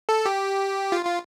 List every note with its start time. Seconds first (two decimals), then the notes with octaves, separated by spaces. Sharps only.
0.09 A4
0.26 G4
0.92 F4
1.05 F4